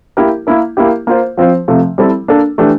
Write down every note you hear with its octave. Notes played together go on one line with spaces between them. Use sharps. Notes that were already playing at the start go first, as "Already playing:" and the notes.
A#3 E4 G4 A#4
A#3 E4 A#4
A#3 E4 G4
A#3 F4 C5
F3 C4 F4 C5
C3 F3 A3
G3 C4 E4 A4
A#3 D4 A4
E3 A3 D4 G4